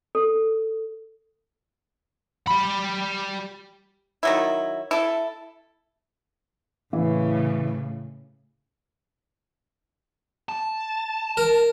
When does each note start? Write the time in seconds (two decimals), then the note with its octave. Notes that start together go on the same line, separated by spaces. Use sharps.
0.15 A4
2.48 G3 B5
4.23 D#3 F#3 E4
4.91 E4 A4
6.93 A2 C#3 E3
10.49 A5
11.37 A#4